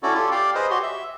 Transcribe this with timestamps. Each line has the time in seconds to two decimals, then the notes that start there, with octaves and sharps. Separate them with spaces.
0.03 C#4 E4 F#4 A4 D5
0.14 F4 G4 A4
0.32 G4 D5 F5 G5
0.55 G#4 B4 C5 D#5
0.70 F#4 G4 C#5 C6
0.82 E5